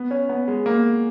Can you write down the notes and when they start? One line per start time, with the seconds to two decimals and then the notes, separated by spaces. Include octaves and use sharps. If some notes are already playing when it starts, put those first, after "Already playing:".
Already playing: B3
0.11 C#4
0.29 B3
0.48 G#3
0.66 A#3